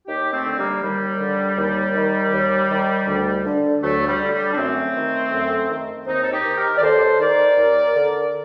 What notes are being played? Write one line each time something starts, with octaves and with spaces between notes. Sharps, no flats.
D#2 D#4 G4
A3 C4
D3
G3 A#3
D#2 G3
D3
D#2
D#3
D#2
D#3
D2
D3
D2 F#3 A3
F#3
G3
D3
G3
D4
F#2 A3 C4
D#3
F#2
D#3
D#2 C4 D#4
A4
D#4 G4
D#3
G4 A#4
D5
D#2 A4 C5
D#3 A#4 D5
D#2
D3